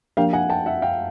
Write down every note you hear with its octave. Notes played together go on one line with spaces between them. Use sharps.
F3 A#3 D4 G4 A#4 F5 G5
F#5 G#5
G5 A5
E5 F#5
F5 G5